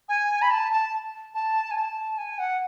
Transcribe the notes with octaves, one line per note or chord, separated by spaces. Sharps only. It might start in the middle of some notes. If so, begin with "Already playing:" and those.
G#5
B5
A5
A5
A5
G#5
A5
G#5
F#5